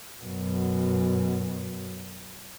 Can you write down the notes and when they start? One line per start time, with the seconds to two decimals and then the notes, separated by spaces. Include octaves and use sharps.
0.22 F#2 B2